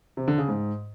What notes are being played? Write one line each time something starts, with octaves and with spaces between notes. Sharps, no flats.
C3
D3
C#3
G#2